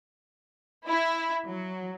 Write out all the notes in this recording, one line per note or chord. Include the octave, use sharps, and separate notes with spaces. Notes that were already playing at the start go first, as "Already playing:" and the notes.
E4
F#3